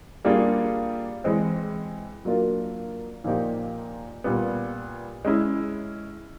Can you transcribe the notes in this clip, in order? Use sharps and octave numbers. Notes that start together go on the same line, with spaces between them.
G3 A#3 D4 F4 G#4
E3 G#3 C4
F#3 A#3 D4 F4 A#4
A#2 F3 A#3 D#4 G4
A#2 G3 B3
G#3 C#4 E4